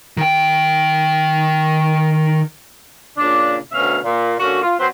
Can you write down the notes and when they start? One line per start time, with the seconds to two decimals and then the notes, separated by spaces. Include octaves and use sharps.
0.17 D#3 G5
3.17 A#2 C#3 D4
3.72 D2 B2 C#4 E5 F5
4.03 A#2
4.40 D3 A#3 C#4 F#4
4.62 F4
4.79 F#3 C4 B4 C5